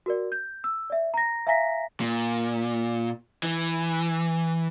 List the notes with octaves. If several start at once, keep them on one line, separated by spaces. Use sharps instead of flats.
F#4 A#4 D5
G6
E6
D5 E5
A#5 A#6
E5 F5 G#5 A#5 A#6 B6
A#2
E3